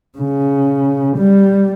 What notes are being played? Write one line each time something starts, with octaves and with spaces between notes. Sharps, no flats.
C#3
G3